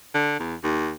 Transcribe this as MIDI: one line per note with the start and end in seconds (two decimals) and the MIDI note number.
0.14 0.36 50
0.39 0.55 40
0.63 0.91 39